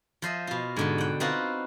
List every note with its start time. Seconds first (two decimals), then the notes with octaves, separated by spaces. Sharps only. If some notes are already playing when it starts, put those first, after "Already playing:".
0.22 F3 C5 D#5 E5
0.47 B2 F4
0.76 G#2 D3 G4
0.98 F#5 G5
1.20 C4 D#4 F4 F#4 B4 F5